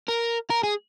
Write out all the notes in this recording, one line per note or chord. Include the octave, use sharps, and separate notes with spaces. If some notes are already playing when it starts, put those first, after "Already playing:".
A#4
A#4
G#4